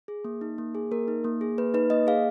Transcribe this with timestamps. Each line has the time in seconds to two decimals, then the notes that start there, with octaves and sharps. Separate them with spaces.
0.08 G#4
0.25 A#3
0.41 D#4
0.58 A#3
0.75 G#4
0.91 A#3 A#4
1.08 D#4
1.24 A#3
1.41 G#4
1.58 A#3 B4
1.74 D#4 B4
1.90 A#3 D#5
2.07 G#4 F5